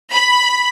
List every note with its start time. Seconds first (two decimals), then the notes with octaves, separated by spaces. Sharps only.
0.11 B5